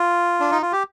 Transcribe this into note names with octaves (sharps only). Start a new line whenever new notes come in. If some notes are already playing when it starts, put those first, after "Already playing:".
Already playing: F4
D4
D#4
F4
G4